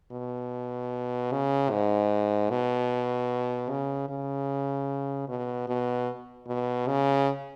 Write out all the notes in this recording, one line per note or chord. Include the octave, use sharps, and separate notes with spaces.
B2
C#3
G#2
B2
C#3
C#3
B2
B2
B2
C#3